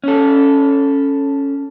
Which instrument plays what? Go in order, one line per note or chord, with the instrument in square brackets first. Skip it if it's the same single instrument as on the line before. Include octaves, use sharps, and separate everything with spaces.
[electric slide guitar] C#4 A4